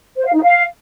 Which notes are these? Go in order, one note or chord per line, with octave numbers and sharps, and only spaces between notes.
C5
F5
D#4
F5